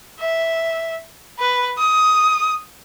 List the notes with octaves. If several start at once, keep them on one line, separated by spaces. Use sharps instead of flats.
E5
B4
D#6